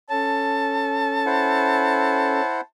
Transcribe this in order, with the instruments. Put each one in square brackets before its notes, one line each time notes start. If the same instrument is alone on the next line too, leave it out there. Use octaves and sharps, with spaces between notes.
[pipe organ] C#4 A4 [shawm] A5
[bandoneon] E4 C5 F#5